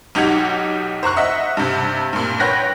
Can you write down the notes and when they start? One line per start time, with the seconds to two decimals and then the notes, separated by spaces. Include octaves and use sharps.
0.15 B1 D#4 G4 F#5 G#6 F7
1.03 C5 A#5 C#6 F#6
1.16 D#5 E5 F#5
1.57 G2 C3
2.13 G2 A#2
2.40 B4 C#5 G5 F#6 A#6